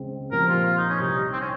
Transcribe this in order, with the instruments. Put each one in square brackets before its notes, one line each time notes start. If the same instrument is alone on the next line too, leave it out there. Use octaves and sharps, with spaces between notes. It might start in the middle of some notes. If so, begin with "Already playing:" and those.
Already playing: [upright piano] C#2 C#3 G#3 C4
[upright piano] A#2 F3 C4 G4 [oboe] A#4
[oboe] F4
F4
D#4
C#4
[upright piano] C2 C3 G3 [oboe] D#4
[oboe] C4
C#4